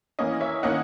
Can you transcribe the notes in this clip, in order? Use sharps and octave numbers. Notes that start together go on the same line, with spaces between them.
E3 A#3 C#4 D#5
C#5 E5
D#3 A#3 C#4 D#5 F#5